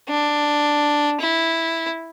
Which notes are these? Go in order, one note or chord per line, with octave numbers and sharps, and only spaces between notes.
D4
E4